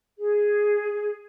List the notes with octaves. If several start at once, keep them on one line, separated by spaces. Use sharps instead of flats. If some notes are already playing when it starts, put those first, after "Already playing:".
G#4